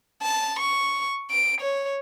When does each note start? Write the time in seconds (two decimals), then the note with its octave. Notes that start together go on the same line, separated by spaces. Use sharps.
0.22 A5
0.59 C#6
1.31 D7
1.61 C#5